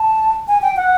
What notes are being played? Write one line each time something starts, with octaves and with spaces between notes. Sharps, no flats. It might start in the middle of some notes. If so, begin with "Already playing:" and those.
Already playing: A5
G#5
G5
F#5